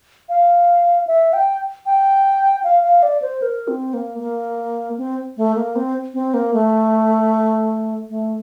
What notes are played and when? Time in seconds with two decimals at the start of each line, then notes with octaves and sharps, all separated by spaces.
0.29 F5
1.07 E5
1.33 G5
1.86 G5
2.64 F5
2.83 F5
3.03 D5
3.22 C5
3.42 A#4
3.68 C4
3.94 A#3
4.19 A#3
4.98 C4
5.37 A3
5.55 A#3
5.76 C4
6.14 C4
6.34 A#3
6.54 A3
8.10 A3